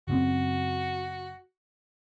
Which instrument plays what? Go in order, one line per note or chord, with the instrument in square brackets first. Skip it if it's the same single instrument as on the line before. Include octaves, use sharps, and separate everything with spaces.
[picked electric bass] F#1 F#2 C4 [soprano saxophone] F#4